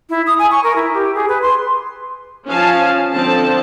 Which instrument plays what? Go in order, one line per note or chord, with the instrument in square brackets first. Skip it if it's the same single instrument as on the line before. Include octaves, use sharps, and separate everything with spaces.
[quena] E4
D#6
G#5
C#6
A#4
E4
G4
G#4
B4
C6
[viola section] F3 C#4 F5 G#5 A5
D3 F3 C4 A5